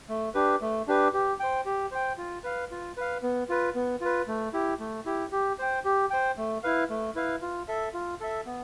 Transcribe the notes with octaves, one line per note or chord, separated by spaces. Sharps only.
A3
D4 G4 B4
A3
D4 G4 B4
G4
C5 G5
G4
C5 G5
F4
B4 F5
F4
B4 F5
B3
F4 B4
B3
F4 B4
A3
E4 G4
A3
E4 G4
G4
C5 G5
G4
C5 G5
A3
E4 B4 F5
A3
E4 B4 F5
F4
A4 E5
F4
A4 E5
B3